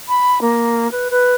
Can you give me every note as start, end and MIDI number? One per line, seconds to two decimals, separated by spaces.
0.08 0.41 83
0.41 0.90 58
0.91 1.08 71
1.10 1.35 71